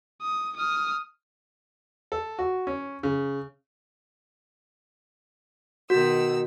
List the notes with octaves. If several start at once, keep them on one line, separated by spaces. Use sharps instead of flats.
D#6
D#6 F6
A4
F#4
C#4
C#3
B2 D#3 F#4 E6